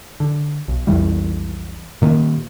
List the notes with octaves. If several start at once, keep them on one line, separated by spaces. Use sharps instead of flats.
D3
B1
B1 F2 E3 G3
A#2 D#3 A#3